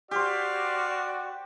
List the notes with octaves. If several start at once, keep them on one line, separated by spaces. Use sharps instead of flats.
F#4 G4 C5 D5 F5